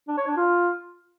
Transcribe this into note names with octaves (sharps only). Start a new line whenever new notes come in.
D4
C#5
D4
F4